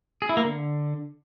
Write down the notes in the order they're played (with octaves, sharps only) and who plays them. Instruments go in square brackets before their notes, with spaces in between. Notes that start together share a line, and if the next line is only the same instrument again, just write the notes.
[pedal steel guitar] G#4
E4
A#3
D3